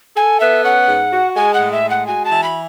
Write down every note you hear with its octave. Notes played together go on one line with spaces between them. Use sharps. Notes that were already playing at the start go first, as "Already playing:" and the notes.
A4 G#5
B3 E5
C#4 F#5
G#2
F#4
G#3 G#5
F#5
A2
E5
G#3
F#5
F#4 G#5
A5
E3
B5